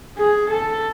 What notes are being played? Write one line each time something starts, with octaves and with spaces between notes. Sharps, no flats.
G#4
A4